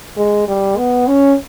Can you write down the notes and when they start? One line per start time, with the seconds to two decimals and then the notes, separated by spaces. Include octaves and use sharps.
0.18 G#3
0.48 G3
0.77 B3
1.07 C#4